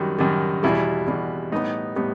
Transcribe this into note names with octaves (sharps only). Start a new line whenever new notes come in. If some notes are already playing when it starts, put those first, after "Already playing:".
Already playing: F#2 D#3 G3 F#4
F#2 D#3 G3
E2 B2 G3 E4
E2 B2 G3
A2 G3 B3 D#4
A2 G3 B3